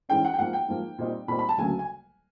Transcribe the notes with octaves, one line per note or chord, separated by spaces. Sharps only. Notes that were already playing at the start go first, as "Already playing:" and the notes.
G#2 E3 G#3 C#4 G5
F#5
G5
G#2 F3 A#3 F#5
G5
G#2 F3 A#3
A#2 G3 C4 D#4
A#2 G3 C4 D#4 B5
B5
A5
D2 C#3 F#3 A#3 G#5
G#5